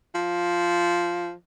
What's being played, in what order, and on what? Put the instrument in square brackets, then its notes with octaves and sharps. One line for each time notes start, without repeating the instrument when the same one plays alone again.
[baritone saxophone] F3